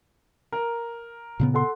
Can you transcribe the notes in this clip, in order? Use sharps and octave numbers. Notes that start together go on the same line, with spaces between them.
A#4
A#2 C#3 B3
A4 F#5 C6